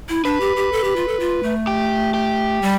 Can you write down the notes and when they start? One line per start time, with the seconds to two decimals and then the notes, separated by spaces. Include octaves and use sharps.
0.09 E4
0.24 D4 B4
0.40 G4
0.56 G4
0.72 A4
0.84 G4
0.96 F4
1.08 A4
1.20 F4
1.43 A3
1.67 G4
2.14 G4
2.62 G3